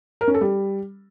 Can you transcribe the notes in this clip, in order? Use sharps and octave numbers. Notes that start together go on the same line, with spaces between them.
A#4
C#4
A4
G3